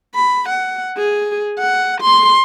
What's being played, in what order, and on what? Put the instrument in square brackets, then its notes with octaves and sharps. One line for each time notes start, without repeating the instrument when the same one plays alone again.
[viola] B5
F#5
G#4
F#5
C6